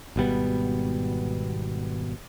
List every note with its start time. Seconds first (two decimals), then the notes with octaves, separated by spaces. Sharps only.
0.16 G#1 B2 G3 B3